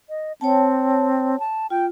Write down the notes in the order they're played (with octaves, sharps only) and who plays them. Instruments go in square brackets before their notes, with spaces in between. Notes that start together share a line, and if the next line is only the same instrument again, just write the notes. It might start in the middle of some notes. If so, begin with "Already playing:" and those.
[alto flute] D#5
[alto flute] C4 [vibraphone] C#5 G5 A5
[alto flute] A5
[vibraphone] F4 [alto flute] G5